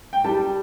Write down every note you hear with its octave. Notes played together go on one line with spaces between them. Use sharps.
G5
G3 A5